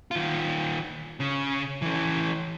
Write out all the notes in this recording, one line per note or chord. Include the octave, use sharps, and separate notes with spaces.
D#3 F4
C#3
E3 C#4